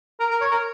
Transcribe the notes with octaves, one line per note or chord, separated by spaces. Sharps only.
A#4
A#4
C#5
A#4